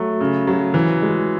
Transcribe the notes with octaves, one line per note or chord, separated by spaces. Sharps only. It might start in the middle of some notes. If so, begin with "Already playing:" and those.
Already playing: F#3 A3
C#3
F#3
E3
G#3